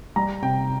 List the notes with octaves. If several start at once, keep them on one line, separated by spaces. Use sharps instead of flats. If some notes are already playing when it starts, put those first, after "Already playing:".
G3 A#5
C3 G5